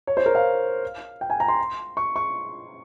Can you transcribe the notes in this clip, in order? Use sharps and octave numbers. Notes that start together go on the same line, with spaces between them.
C#5
C5
A#4
F5
G5
G#5
A#5
C6
C#6
C#6